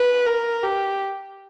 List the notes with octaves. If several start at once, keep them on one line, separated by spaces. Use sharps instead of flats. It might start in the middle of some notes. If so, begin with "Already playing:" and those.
Already playing: B4
A#4
G4